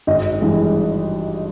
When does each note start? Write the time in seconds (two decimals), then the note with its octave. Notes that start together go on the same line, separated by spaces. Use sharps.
0.07 G#1 D#5
0.41 G2 E3 G#3